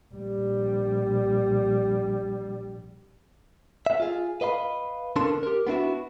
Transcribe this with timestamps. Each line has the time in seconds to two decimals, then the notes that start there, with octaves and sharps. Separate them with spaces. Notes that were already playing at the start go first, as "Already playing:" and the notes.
0.14 A#1 G3
3.86 E5
4.00 F4 G#4
4.41 B4 D#5 F5 B5
5.16 D3 C#4 D4 A4 A#4 C6
5.43 G4 A#4
5.67 B3 D4 E4 F#4